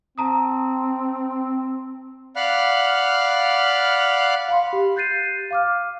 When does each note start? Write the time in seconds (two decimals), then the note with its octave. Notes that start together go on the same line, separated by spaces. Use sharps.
0.18 C4 A5 A#5 D#6
2.36 D5 F5 F#5 B5 F6 F#6
4.48 F5 B5 C6
4.73 G4
4.96 F#6 G6 A6 C7 D#7
5.51 F5 D6 F6